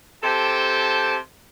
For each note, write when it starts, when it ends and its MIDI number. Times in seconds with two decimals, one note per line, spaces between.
0.22 1.17 48
0.22 1.17 67
0.22 1.17 69
0.22 1.17 72
0.22 1.17 79
0.22 1.17 81